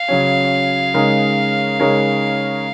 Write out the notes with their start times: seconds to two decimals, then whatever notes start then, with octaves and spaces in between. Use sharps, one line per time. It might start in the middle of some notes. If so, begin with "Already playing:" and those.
Already playing: F5
0.08 C#3 F#3 C#4
0.94 C#3 G#3 D#4 A#4 C#5
1.80 C#3 G#3 D#4 A#4 C#5